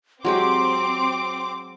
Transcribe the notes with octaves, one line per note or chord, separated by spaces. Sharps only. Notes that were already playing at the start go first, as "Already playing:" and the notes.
F#3 G#3 C4 G4 C6 D6